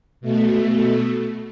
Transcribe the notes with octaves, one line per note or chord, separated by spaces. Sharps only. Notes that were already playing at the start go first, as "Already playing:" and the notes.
B2 A3